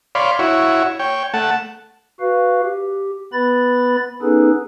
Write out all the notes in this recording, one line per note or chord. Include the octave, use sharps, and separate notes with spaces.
C#5 D5 F5 B5 C6
E4 F#4 C#5
C#5 G5
A3 F#5 A5
F#4 B4 F5
G4
B3 B4 B5 A6
B3 C#4 D#4 G#4 A4 B4